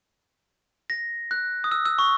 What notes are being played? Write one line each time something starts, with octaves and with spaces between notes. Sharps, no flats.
A#6
F#6
D#6
E6
E6
C#6